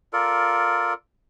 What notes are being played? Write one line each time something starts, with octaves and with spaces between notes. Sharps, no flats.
F4 A4 A#4 D5